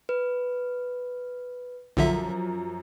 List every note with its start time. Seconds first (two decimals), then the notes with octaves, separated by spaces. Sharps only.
0.09 B4
1.97 B1 F#2 D3 F3 E5